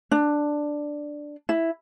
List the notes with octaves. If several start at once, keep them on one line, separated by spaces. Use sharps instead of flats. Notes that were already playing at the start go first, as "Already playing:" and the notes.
D4
E4